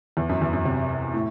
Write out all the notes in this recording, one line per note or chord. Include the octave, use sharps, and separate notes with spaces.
E2
F#2
E2
F#2
C3
A2